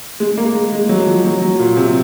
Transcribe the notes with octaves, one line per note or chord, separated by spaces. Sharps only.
G#3
A#3
G#3
G#3
F#3
F3
F#3
F#3
A#2
C3